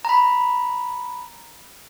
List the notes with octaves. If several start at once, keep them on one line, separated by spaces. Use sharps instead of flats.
A#5 B5